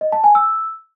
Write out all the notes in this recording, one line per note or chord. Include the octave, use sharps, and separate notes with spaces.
D#5
A5
G#5
E6